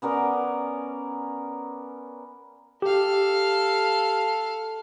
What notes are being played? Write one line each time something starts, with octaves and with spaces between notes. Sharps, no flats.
B3 C#4 A#4 D5
G4 A4 F5